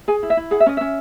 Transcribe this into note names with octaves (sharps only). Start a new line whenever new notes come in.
G#4 G#5
E4
E5
E4
G#4 F#5
E5
C#4 D#5
C#4 E5